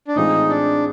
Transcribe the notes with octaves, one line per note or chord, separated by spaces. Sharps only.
D4
A2 E3 G#3 C4 D#4 F4
D4